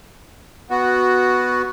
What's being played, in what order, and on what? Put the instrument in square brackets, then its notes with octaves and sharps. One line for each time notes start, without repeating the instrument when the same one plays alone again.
[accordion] B3 F#4